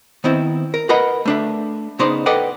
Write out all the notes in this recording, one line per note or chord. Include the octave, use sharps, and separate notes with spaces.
D#3 B3 C4 E4
A#4
A#4 B4 D#5 F#5 B5
A3 D4 E5
C#3 B3 D#4 C5 D5 C6
A4 B4 D5 D#5 F#5 G5